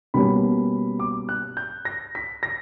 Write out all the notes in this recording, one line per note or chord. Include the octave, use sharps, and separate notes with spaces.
B2 G3 A#3 C#4 B5
D6
F#6
G6
A#6
B6
A#6